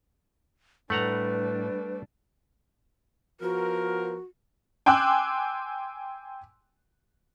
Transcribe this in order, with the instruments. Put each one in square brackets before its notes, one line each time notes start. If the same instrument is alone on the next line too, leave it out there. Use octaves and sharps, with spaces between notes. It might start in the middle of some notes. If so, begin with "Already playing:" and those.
[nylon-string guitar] A2 [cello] G3 D4 [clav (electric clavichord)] A3 F#5 A#5 [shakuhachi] B4
[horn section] F3 B3 A#4 [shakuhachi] F#4
[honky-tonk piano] G5 G#5 C6 D6 E6 F#6